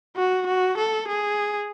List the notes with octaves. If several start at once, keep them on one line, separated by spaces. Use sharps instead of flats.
F#4
F#4
A4
G#4